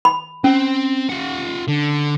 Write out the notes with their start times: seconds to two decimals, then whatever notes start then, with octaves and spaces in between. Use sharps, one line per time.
0.05 B5
0.44 C4 C#4
1.09 F4 F#5
1.68 D3